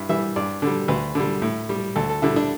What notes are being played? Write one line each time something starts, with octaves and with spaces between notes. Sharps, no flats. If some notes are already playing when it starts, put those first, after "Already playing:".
Already playing: G2 E4
E3 G3 E5
G2 D5
D3 G3
D2 B4
D3 G3
A2
G3
D2 A4
A4
D3 G3 E4
D4